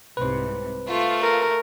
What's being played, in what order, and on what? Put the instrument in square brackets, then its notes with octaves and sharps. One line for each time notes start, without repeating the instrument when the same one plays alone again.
[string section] C2 G#2 C3 [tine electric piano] B4 C5
[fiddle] A3 [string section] F4
[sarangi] A#4